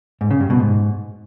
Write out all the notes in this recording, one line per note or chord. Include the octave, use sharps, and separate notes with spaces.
G#2
C#3
G2
B2
G#2